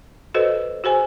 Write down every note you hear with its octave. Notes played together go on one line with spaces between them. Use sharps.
F#4 A4 B4 C5 D#5
F#4 G#4 C5 G#5